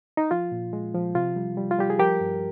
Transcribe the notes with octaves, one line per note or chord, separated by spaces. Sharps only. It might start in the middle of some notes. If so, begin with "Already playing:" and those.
D#4
F3 F4
A#2
G#3
F3
C3 F4
G3
G3
F4
G3 G4
G#4
F3 G4 A#4
G2